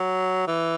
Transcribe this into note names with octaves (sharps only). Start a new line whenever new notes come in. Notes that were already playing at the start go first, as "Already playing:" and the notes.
Already playing: F#3
E3